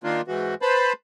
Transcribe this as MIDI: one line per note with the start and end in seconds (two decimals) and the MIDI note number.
0.04 0.21 51
0.04 0.21 58
0.04 0.21 62
0.04 0.21 65
0.28 0.55 44
0.28 0.55 52
0.28 0.55 66
0.62 0.93 71
0.62 0.93 72
0.62 0.93 81
0.62 0.93 83